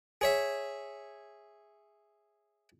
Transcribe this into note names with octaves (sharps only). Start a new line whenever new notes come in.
G#4 C#5 E5